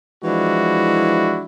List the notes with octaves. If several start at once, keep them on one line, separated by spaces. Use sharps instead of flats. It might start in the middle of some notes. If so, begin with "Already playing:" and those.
E3 F3 G#3 D4 E4 F#4